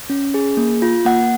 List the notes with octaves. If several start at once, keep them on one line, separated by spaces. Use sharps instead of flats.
C#4
G#4
A#3
F4
A#3 F#5